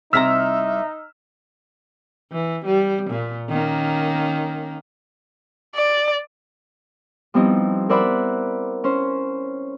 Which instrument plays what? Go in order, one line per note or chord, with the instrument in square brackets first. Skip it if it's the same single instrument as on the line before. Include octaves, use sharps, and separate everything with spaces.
[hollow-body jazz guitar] C2 C3 A#5 [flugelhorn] D#4 [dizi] E5 [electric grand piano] E6 F6 B6
[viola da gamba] E3
G3
A#2
D#3 A#3 C#4
[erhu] D5
[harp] F3 G3 B3 C4 D#4 E4
A#4 C5 D5 E5 F#5 B5
C#4 C5